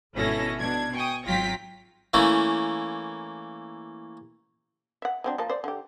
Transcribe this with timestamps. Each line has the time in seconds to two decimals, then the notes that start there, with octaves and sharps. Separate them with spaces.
0.15 G#1 B2 C#4 E4 A4 A#6
0.58 B2 D4 G#6
0.94 G5 G#5 C#6 D#6
1.26 G#1 F#3 F4 G5 A#6 B6
2.14 E3 A3 A#3 C#4 E4
5.02 E5 F#5
5.24 F#3 C4 D4
5.38 F3 A#3 A5
5.50 C5 D5
5.64 D3 G4